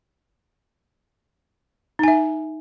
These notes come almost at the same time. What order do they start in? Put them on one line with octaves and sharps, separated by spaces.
D#4 G#5 E5